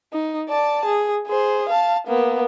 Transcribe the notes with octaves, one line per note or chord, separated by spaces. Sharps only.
D#4
D5 A5
G#4
G#4 C5
F5 A5
A#3 B3